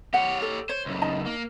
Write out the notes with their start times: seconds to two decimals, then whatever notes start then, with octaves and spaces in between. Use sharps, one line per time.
0.14 G4 C#5 F#5
0.42 A4
0.69 C5 C#5
0.86 C#2 F#2
1.02 D#4 D#5 A5
1.26 A#3